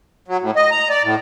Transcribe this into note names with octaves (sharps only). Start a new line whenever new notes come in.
F#3
A2
D#5
A#5
D5
A2